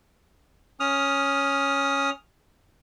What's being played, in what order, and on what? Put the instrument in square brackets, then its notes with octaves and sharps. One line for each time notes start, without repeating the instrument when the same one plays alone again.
[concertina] C#4 D#6 F6